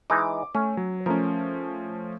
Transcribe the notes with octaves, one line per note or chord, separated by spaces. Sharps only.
E3 G#3 D#4 D6
A3 C#4
F#3
F3 A3 C#4 A#4